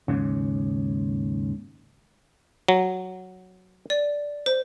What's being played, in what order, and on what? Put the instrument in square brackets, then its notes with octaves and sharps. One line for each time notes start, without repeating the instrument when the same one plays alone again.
[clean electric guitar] D#2 G#2 C#3
[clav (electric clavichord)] F#3
[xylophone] D5
C5